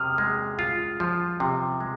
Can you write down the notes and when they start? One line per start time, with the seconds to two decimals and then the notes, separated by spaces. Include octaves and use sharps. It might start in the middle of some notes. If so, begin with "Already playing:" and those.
Already playing: C3 D#6 F6
0.18 G#3
0.59 F4
1.00 F3
1.40 C3
1.80 G#3